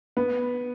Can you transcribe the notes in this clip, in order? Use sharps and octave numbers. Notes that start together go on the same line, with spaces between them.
B3